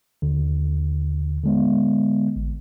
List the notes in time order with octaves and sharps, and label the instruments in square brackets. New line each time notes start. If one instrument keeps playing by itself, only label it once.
[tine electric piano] D#2 D3
D3 G#3 B3
A1